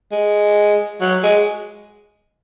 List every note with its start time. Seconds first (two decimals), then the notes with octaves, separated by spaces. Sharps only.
0.12 G#3
1.01 F#3
1.23 G#3